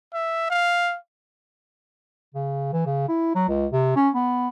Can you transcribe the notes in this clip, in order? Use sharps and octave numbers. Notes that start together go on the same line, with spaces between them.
E5
F5
C#3
E3
C#3
E4
F#3
C#2
C3
C#4
B3